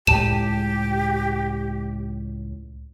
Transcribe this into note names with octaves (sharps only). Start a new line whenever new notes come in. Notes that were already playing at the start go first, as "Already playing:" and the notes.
C#2 A2 G#3 G4 A5 E7